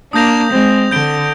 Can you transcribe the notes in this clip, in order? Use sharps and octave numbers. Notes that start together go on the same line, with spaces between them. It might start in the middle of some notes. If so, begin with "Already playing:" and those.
A#3 D4 D#6 G6 A#6 F7
G#3 C4
D3 G6 D7 G7